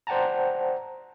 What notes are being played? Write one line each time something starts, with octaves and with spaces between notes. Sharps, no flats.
C5 D5 F#5 G5 A5 A#5